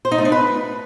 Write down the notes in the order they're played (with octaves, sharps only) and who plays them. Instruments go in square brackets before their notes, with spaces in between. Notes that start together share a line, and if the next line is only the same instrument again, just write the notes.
[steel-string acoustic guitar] C5
D#4
A3
D4
B4